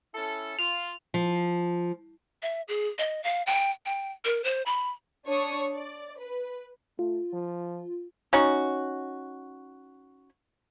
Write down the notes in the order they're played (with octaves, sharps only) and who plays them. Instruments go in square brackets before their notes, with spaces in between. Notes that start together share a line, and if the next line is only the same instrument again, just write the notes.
[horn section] C#4 E4 A4
[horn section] F4 [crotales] F7
[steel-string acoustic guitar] F3
[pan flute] E5
G#4
D#5
F5
G5
G5
A#4
C5
B5
[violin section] D4 C#5 C#6 D#6
D5
B4
[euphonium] A3 [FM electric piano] F4
[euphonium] F3
[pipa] C#4 D#4 F#4